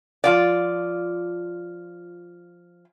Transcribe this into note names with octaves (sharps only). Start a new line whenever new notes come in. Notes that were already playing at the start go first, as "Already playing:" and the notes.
F3 F4 D5